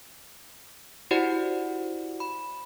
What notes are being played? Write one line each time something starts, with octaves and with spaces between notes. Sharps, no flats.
E4 F#4 G4 C5 D5 F#5
B5